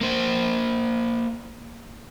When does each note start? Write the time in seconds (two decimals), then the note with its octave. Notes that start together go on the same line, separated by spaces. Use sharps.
0.01 A#3 C5